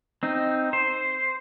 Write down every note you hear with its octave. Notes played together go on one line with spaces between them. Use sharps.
C4 D#4
C5